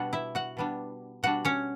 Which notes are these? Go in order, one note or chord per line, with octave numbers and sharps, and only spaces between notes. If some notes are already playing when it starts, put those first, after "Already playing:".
Already playing: B2 G3 B3 D4 F#4 F#5
E4 E5
F#4 F#5
B2 G3 B3 D4
B2 G3 D4 F#4 F#5
C#4 C#5